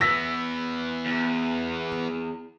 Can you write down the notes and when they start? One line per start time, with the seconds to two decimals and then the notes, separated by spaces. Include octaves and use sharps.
0.01 E3 B3 E6 A#6 B6
1.06 E2